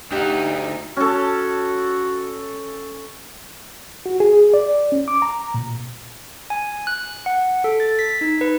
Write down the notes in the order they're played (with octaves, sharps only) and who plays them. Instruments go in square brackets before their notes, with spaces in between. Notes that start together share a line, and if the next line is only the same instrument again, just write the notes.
[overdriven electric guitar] D2 [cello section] D#4 [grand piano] G4 F#5
[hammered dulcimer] C#4 A4 [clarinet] F#4
[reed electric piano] F#4
G#4
D5
C#4
D6
A#5
A#2
[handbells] G#5
F#6
F#5
A4
A6
B6
D#4
B4